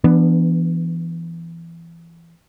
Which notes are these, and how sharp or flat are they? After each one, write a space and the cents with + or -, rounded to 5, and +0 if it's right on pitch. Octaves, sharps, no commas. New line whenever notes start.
E3 +25 B3 -5 D4 +10